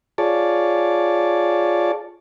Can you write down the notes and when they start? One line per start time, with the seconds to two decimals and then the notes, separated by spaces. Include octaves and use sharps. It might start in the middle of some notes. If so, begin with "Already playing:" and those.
0.18 F4 G#4 C#5 D5 A5